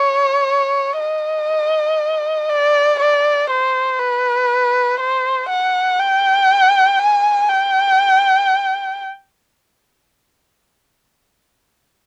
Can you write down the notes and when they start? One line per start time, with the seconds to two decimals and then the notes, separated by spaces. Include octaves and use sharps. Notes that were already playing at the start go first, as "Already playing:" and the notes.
Already playing: C#5
1.00 D#5
2.49 D5
3.00 D5
3.50 C5
3.99 B4
5.00 C5
5.49 F#5
5.99 G5
6.99 G#5
7.49 G5